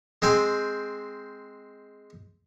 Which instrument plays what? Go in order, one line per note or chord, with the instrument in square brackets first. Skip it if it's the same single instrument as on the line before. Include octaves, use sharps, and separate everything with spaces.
[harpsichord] G#3 C4 G5 G#5